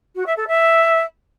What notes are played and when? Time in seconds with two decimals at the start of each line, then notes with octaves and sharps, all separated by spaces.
0.16 F#4
0.26 E5
0.37 A4
0.47 E5